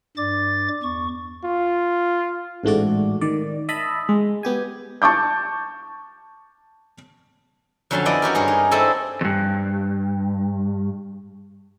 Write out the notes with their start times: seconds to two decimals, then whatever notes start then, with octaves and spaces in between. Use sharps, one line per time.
0.17 G2 D5 D6 A6
0.83 E2 C#6
1.44 F4
2.64 A1 G#2 A3 F#4 D5
3.21 D#3 D5
3.69 D#5 E5 A5 B5
4.09 G#3
4.43 B3 G4 G#5
5.02 A5 C#6 D6 G6
7.91 F2 D3 F#3 C#4 A5 C6
8.05 B3 E4 D5 D#5
8.22 C#4 F#4 G4 A#4
8.35 G2 C#4 G#4 A#4 C#5
8.48 D#4
8.71 C4 E4 G#4 A4 D5 D#5
9.21 E2 G2